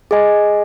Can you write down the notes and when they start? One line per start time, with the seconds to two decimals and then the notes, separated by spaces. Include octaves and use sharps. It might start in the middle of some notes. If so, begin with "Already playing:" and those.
0.11 G#4 D#5 G#5